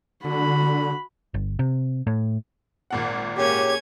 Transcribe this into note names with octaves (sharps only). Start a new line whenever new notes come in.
D3 F#4 B5
G1
C3
A2
G#1 A#2 F#5
A#3 C#4 G4 G#4 C#5 G#6